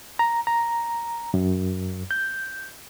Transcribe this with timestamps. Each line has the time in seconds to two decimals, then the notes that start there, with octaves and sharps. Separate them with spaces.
0.19 A#5
0.47 A#5
1.34 F#2
2.11 G6